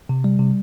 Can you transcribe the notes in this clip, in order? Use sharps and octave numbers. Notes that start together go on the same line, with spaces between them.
C3
G3
C3